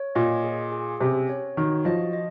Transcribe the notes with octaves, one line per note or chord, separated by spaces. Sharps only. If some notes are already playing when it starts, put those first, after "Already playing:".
Already playing: C#5
A#2 D#5
G#4
G#4
C3 C#4
C#5
D#3 F#4
F3 D#5
D#5